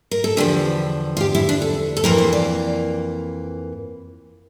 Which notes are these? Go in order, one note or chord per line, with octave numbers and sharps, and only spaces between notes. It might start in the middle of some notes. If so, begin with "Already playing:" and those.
A#4
A4
E2 D3 F3 G4
F4
G4
E4
D4
A4
A4
F2 E3 A#3 A#4
C5
D5